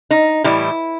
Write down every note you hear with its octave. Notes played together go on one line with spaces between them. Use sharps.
D#4
A2 E3 G3 E4